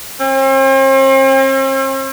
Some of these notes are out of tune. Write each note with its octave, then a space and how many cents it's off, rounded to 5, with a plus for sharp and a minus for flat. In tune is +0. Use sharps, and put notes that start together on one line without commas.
C4 +45